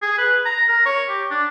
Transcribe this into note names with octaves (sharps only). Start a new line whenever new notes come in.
G#4
B4
A#5
A#4
C#5
G4
D4